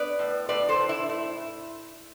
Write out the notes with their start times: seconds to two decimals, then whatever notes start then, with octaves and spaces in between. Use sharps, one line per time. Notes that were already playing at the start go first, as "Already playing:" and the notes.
Already playing: B3 B4 D5
0.19 A2
0.49 A2 B4 D5
0.69 A4 C5
0.79 A2
0.89 E4
1.09 A3 E4